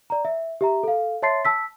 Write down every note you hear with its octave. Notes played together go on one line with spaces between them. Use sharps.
D5 A#5
E5
G4 E5 A#5
A4 F5
C#5 E5 A5 C6 A6 C7
A5 E6 B6